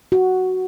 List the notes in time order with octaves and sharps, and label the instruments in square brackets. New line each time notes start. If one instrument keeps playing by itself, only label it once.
[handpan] F#4